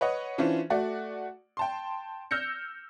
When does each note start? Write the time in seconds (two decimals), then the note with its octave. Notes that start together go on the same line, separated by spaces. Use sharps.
0.01 B4 C#5 D#5 F#5
0.38 E3 C#4 D4 F4 C5
0.70 A3 F#4 D5
1.57 G5 A5 C6
2.31 E6 F6 G6 A#6 C#7